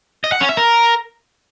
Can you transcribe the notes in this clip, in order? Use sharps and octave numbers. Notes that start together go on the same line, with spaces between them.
D#5
F#5
C#4
E5
A#4